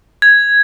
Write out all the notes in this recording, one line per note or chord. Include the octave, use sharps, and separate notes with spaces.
G#6